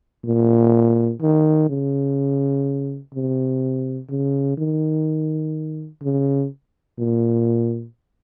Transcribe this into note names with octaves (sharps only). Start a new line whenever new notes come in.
A#2
D#3
C#3
C3
C#3
D#3
C#3
A#2